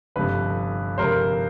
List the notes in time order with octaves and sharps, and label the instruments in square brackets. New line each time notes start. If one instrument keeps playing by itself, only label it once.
[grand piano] G1 F2 C3 B4
G1 F2 C3 A#4 C5